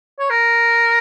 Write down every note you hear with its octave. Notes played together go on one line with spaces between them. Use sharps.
C#5
A#4